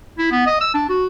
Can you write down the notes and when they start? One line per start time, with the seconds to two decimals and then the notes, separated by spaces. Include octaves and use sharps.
0.19 E4
0.32 B3
0.47 D#5
0.61 E6
0.75 D4
0.89 F#4